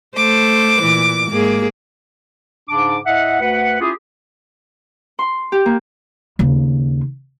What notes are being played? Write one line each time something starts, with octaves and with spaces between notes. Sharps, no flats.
A3 C5 D6
A#2 E3
G#2 A#3 G#4
G#2 C#3 D4 D6
A2 D#5 E5 F#5
D2 B4 F#5
C#4 E4 F4 G4 G#4
C6
G4
A#3
D#2 C#3